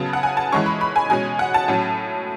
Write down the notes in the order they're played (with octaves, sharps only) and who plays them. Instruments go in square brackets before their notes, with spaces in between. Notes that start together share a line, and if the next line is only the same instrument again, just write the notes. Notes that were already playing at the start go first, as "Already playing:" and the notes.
Already playing: [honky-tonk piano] C#3 F#3 B3 A5
F#5
G#5
A5
E3 G#3 C#4 C#6
B5
B5
G#5
B2 G#3 C#4 G#5
F#5
A5
A2 F#3 C#4